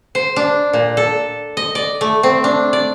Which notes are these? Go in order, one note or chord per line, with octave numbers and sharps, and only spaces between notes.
C5
D4
A#2
A4
D#5
D5
A3
C4
D4
D5